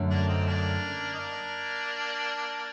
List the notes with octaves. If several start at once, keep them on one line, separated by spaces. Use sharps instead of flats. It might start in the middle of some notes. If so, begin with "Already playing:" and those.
Already playing: F#2 D3 A3
A#3 D4
C4 D#4
A#3 D4
D#4
A#3 D4